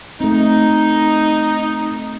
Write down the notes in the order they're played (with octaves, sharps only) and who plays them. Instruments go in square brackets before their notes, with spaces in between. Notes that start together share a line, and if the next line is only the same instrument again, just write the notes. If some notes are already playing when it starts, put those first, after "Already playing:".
[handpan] A3 C4 [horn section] D#4